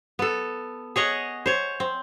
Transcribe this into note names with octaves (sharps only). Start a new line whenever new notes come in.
B3 A4
G#4 C#5 D#5 F#5
C5 C#5
C4